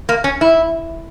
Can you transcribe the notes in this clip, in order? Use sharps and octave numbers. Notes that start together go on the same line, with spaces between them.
A#3
C#4
E4